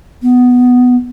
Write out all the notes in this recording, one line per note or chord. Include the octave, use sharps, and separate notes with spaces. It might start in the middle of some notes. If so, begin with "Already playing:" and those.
B3